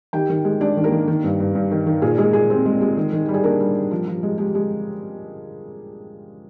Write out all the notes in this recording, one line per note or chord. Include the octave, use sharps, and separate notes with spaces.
D#3 G4 G5
D#3
G#3
G#3 D4 D5
D#3
A#3 A#4
D#3
D#3
G2
G2
G2
D#3
D#3
A#2 G#4
G#3 G#4
A#2 G#4
C4
G#3
G#3
D#3
D#3
G3 G4
G#4
A#3 D4 A#4
G3
G3
F3
F3
G#3
G#3 G4
G#3